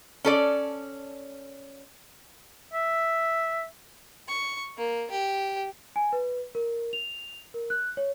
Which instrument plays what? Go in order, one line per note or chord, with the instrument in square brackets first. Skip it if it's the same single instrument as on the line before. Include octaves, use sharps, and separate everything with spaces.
[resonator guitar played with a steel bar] C#4 A4 D5
[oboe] E5
[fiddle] C#6
A#3
G4
[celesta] G#5
B4
A#4
F7
A#4
F#6
C#5